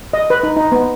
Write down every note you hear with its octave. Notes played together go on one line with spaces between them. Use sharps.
D#5
B4
D#4
D#4
B3